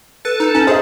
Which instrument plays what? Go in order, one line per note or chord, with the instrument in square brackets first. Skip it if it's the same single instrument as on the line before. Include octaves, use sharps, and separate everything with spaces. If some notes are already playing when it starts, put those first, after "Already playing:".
[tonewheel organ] A4 A5 [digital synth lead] B4
[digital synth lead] D#4
[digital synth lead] C#4 [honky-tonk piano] A#5
[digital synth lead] G#4 [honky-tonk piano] C5 D#5